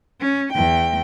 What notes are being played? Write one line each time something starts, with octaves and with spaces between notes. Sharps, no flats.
C#4
E2 G5